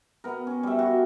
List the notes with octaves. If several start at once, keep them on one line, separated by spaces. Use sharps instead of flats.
B3 A#4
C#4
G3 E5
F#4